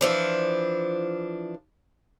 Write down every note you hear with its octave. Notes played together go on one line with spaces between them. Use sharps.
E3 F3 D4